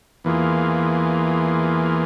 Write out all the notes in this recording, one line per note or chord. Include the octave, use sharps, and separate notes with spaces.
E2 E3 A#3 F4 G#4